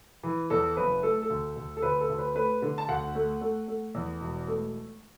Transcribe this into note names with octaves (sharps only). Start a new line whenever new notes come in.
E3
E2 A4
F#1 B4
A3 A4
A4
D2
D2
A4
D2 B4
A4
D2
B4
A3 B4
D3
A5
D2 F#5
A3
A3
A3
E2
E1
A3